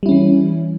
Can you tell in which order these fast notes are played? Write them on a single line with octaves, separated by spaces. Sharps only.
G3 E4 C#4 E3